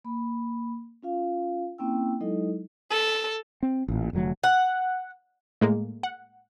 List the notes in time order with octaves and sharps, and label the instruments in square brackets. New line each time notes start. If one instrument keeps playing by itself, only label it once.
[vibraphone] A#3 B5
C#4 F4 F5
A#3 C4 C#4 E4 G5 E6
F#3 G#3 D#4 E4 A4 D#5
[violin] A4
[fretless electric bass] C4
A1 A#2
F1 D3 F#3 A3
[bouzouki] F#5
[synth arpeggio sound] A2 G#3 A#3
F#5